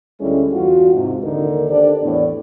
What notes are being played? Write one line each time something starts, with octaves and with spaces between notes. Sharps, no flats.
D2 G3 G#3 C#4 E4 A4
E2 G2 F4 F#4
G#2 C3 F3
D#2 D3 D#4 A#4
D4 G4 A4 C5 D5
E2 A2 E3 B3 D5